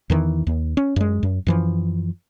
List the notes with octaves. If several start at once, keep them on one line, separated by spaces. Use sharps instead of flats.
E2 D#3 E3
D#2
C#4
F#2 G#3
F#2
F#2 E3 F3